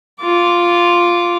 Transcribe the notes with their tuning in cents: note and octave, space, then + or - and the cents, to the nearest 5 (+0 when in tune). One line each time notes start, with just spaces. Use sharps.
F4 +0 D6 -20